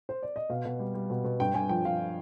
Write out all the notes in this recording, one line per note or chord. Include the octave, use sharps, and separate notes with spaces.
C5
D5
D#5
B2 F5
B2
G3
G3
B2
B2
G2 G5
G2 G#5
F3 G5
F3 F5